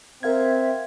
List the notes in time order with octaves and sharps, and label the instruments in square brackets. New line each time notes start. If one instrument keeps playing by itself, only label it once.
[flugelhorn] C4 [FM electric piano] A#4 F5 G#6 [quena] E5